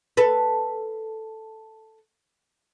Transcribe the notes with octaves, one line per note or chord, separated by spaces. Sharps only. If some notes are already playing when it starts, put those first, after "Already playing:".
A4 B4